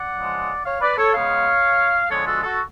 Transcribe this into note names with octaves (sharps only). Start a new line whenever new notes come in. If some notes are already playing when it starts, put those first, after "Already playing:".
Already playing: D5 F#5
C#3 F3 G#3
C#5 F5
B4 D5
A4 C#5
C#3 G#3 B3 C#5 F5
D3 F3 G#3 B3 A4 C#5
F#4 A4
F#4 A4